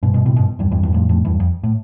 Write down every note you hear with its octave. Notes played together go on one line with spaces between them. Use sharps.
G2 B2
G2 B2
A2 C3
G2 B2
E2 G2
E2 G2
E2 G2
F2 A2
F2 A2
E2 G2
F2
A2